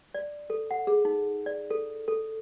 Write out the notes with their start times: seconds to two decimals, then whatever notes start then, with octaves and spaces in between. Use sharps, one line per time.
0.14 D5
0.50 A4
0.71 F#5
0.87 G#4
1.05 D#4
1.46 D5
1.70 A4
2.08 A4